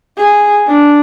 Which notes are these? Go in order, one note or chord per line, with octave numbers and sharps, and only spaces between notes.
G#4
D4